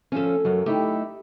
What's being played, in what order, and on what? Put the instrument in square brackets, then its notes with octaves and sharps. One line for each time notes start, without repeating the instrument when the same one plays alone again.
[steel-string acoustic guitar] F3 C#4 [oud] A3 A4
[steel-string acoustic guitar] F#2 F#3
[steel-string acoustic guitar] A3 D#4 E4 [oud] G4